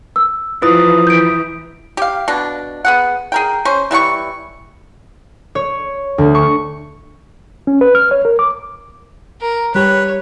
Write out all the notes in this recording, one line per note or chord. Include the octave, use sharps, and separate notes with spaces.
E6
E3 F3 E4 F4 B4 D#6
E3 G6 D7
G4 F5
B2 D4
B3 G#4 F#5
G#4 A#4 G5
C#4 C5
E3 G3 G#4 C#6
C#5
D2
C#6
C#4
B4
F6
C#5
A#4
D6
A#4
G3 G4 B4 C#5